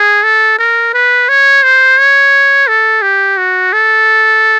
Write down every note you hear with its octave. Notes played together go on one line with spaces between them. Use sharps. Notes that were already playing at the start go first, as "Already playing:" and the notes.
Already playing: G#4
A4
A#4
B4
C#5
C5
C#5
A4
G4
F#4
A4